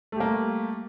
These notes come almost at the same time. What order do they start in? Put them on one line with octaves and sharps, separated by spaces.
A3 G4 A#3 G3